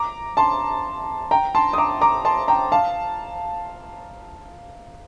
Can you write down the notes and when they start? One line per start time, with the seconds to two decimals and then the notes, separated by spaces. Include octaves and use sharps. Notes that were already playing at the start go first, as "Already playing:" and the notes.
Already playing: A#5 D6
0.37 A5 C6
1.31 G5 A#5
1.55 A5 C6
1.73 D#6
1.78 A#5 D6
2.01 A#5 D6
2.25 A5 C6
2.48 G5 A#5
2.72 F5 A5